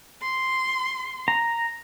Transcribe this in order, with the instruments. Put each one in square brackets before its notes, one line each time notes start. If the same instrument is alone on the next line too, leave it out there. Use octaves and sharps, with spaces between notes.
[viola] C6
[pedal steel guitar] A#5